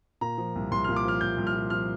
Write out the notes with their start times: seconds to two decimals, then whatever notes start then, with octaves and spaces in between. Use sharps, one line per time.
0.21 A#2 A#5
0.38 F3
0.56 C2
0.71 C2 C6
0.84 F6
0.89 A#2
0.96 D6
1.05 F3 F6
1.21 C2 G6
1.38 C2
1.47 F6
1.55 A#2
1.70 F3 F6